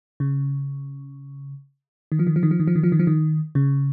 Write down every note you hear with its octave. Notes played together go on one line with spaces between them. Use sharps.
C#3
D#3
F3
D#3
F3
D#3
F3
D#3
F3
D#3
F3
D#3
F3
D#3
C#3